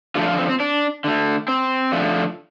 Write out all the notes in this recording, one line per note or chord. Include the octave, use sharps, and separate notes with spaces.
D3 F3 A3 F4
F4
C4
C4
D4
D3 A3
C4
D3 F3 A3